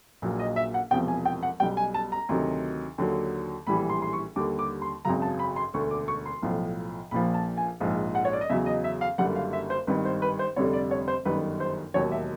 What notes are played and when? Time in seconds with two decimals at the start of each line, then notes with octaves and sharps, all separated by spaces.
0.22 A#1 A#2 F#3
0.39 D#5
0.56 E5
0.74 F#5
0.91 E1 E2 C3 F3 G5
1.08 G#5
1.25 G5
1.43 F#5
1.60 B1 B2 G3 G5
1.77 G#5
1.94 A5
2.12 A#5
2.29 D2 C3 D#3 F#3
2.98 D#2 D3 F#3
3.67 A#1 A2 E3 G3 B5
3.89 C6
4.02 C6
4.13 C#6
4.36 D#2 D3 G3 D6
4.59 D6
4.82 C6
5.05 G#1 F#2 C#3 F#3 A#5
5.22 A5
5.39 B5
5.56 C6
5.74 E1 D2 D3 C#6
5.91 D6
6.08 C#6
6.26 C6
6.43 B1 A2 F3
7.11 A#1 A#2 F3 B5
7.34 A5
7.57 G#5
7.80 A#1 G#2 F3
8.15 F#5
8.25 C#5
8.33 D5
8.41 D#5
8.50 E2 C#3 F#3 E5
8.66 D#5
8.84 E5
9.01 F5
9.18 F#1 F#2 D3 G3 F#5
9.36 F5
9.53 E5
9.70 C5
9.87 G#1 G2 D#3 B4
10.05 C5
10.22 B4
10.39 C5
10.56 F1 F2 D3 G3 C#5
10.73 D5
10.91 C#5
11.08 C5
11.25 G1 F#2 D#3 G3 B4
11.60 C5
11.94 E1 D#2 D#3 F#3 C#5
12.12 E5